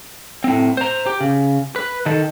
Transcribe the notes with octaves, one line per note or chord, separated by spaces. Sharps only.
A2 C4
C5 A#5
G4
C#3
B4
D#3 A4